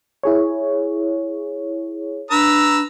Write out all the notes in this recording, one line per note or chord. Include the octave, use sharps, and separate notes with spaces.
E4 G#4 C#5
D4 B4 A#5 E6